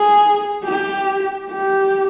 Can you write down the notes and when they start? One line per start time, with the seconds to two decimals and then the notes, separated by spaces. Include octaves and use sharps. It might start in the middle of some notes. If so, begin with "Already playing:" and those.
Already playing: G#4
0.64 G4
1.49 G4